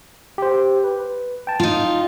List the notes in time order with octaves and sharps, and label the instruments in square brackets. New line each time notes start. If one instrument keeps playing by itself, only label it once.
[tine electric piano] G4 C5
B4
G5 A5
[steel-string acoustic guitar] D#4 F4